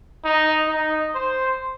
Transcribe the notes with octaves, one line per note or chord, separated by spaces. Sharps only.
D#4
D#4
C5